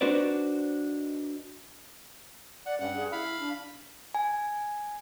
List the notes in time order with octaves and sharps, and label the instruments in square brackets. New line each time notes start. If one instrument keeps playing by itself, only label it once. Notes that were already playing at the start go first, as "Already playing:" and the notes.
[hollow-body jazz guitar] D4 D#4 F#4 B4 C5 D5
[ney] D5 [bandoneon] F#5
[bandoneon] G2 F#5 [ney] C#4
[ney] G#4
[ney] E4 [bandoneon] F5 B5
[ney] D4
[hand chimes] G#5